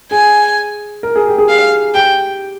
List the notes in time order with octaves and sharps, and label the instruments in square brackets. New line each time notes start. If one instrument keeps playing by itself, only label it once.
[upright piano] G#4 [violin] G#5
[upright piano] A#4
G#4
G4
G#4
[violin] F5
[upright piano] G4 [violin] G5